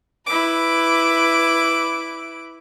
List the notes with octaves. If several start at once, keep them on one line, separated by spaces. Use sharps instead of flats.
E4 B4 D6